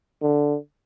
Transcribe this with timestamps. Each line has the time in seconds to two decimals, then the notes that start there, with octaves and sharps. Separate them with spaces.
0.22 D3